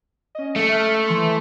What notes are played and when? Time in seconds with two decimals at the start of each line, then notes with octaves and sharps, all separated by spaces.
0.35 C#4 D#5
0.56 A3 E5
0.72 F6
0.94 E5
1.08 E3 C6